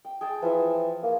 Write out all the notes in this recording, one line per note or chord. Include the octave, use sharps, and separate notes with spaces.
G5
G#4 G5 A5
E3 F3 E5
A#3